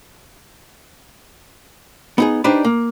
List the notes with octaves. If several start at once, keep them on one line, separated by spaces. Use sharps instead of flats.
B3 D#4 G#4
D4 D#4 G4 B4 C5 D5
A#3